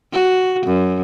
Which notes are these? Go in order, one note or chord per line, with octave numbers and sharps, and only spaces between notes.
F#4
F#2